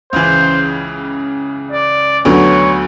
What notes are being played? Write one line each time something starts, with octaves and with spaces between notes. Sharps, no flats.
C#2 C#3 E3 C5
D5
D2 D3 F#3 B3 C#5